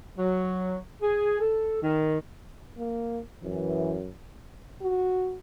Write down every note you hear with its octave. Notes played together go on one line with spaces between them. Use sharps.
F#3
G#4
A4
D#3
A#3
F#2 E3
F#4